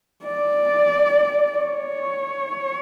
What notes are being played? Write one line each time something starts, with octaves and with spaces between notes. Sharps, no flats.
D5
C#5